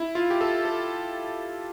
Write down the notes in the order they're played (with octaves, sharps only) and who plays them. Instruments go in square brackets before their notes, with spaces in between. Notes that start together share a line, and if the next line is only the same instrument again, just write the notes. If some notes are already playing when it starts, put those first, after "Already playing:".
Already playing: [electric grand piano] E4
F4
G4
A4
A4